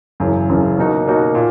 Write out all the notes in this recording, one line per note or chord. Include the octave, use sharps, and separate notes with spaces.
F#1 F#2 C#3 E3
F#1 F#2 C#3 E3
B2 A#3 D#4 F#4
B2 A#3 D#4 F#4
A#2